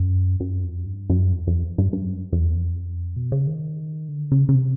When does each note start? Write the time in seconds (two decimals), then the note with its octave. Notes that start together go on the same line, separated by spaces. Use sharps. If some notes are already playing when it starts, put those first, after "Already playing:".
Already playing: F#2
0.40 F#2
0.63 F2
0.86 G2
1.10 F#2
1.33 F2
1.47 F2
1.78 G2
1.93 G2
2.02 F#2
2.32 F2
2.40 E2
2.55 F2
3.16 B2
3.32 C#3
3.47 D#3
4.09 D3
4.32 C#3
4.49 C#3
4.55 C3